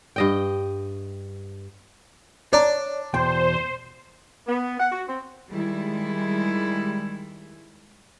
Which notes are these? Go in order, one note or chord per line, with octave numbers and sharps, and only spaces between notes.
G2 D#5 G5
D4 C#5 D5 A#5
E2 B2 C5 G5
B3
F#5
F#4
C4
D#3 G3 G#3 E4